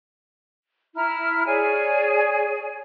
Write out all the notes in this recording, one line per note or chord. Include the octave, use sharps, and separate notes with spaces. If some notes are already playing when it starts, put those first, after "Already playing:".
E4 A#5 F6
G#4 C#5 D5 G#5